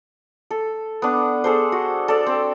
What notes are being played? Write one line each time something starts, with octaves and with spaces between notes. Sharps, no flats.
A4
B3 D4
G#4 A4 C5
F#4
A4 D5
C4